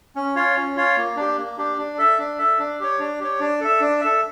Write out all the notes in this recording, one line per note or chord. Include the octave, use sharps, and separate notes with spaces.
C#4
F4 C#5 F5
C#4
F4 C#5 F5
A#3
D4 G4
A#3
D4 G4
D4
A4 E5
D4
A4 E5
D4
G4 C#5
D4
G4 C#5
D4
A4 E5
D4
A4 E5